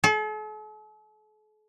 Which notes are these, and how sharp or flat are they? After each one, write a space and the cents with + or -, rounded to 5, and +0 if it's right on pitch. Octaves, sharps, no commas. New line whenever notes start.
A4 -45